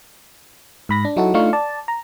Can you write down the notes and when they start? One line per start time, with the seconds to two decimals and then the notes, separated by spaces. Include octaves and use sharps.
0.89 G#2 B5 A#6
1.05 D4
1.16 F#3 D#4 E4 F#4 A4
1.34 A3 D4 D#4 F4 F5 C#6
1.53 D5 A5
1.88 A#5